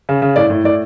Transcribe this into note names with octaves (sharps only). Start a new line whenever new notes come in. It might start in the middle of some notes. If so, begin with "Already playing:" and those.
C#3
C#3
A2 D5
A2
A2 D5